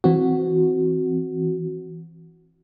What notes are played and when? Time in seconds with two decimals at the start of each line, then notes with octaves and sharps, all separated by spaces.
0.04 E3 C4 F#4